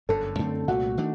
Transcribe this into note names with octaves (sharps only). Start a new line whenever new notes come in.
G1 F#2 D3 A4
F#2 D3 A3 C4
C2 A#2 A3 F#4
D#3 A3 D4